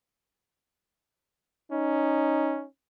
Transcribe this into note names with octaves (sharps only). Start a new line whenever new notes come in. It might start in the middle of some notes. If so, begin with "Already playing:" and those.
C#4 D#4